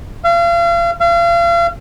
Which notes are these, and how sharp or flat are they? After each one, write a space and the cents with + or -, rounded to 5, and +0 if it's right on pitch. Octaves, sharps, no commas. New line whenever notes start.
F5 -40
F5 -40